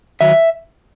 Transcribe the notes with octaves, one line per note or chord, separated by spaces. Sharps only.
D#3 F#3 E5